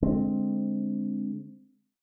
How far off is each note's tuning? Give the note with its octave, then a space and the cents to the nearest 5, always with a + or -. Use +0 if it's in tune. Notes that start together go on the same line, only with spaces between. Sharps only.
D3 +0 G#3 +0 C4 +0